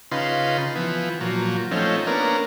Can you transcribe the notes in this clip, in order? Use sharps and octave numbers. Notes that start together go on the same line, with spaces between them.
C#3 D#4 F4 B4 C6
E3 F3 B3
A#2 F3 F#3
F3 A3 C4 C#4 D#4
A#3 B3 C#4 D4 A#4